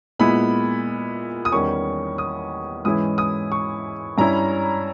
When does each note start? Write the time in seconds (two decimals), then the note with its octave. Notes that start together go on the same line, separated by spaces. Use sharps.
0.19 A#2 G#3 B3 E4 B5
1.45 D#6
1.52 E2 D#3 G3 C#4 C#6
2.18 D#6
2.85 G#2 E3 G#3 C#4 E4 D#6
3.18 D#6
3.52 C#6
4.18 G2 G3 C#4 E4 A#5